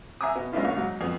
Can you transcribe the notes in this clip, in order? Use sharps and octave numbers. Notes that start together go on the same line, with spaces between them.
E5 G#5 A#5 D6 D#6
B2 B3
G#3 B3 C#4 D4 E4 F4
C2 C#5
G#2 F#3
F2 B3